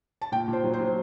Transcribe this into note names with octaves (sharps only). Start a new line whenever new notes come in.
A5
A#2 G5
A#2
C5
F#3
C5
F#3